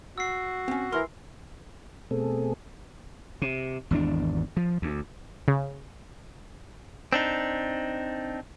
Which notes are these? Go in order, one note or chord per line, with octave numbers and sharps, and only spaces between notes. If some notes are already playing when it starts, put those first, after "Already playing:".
F#4 E6 C7
C4 C#4
E3 A#4 C6
B2 A3 C4 G#4 A4
C3
G#1 E2 C3 D4
F3
D2
C#3
C4 D4 D#4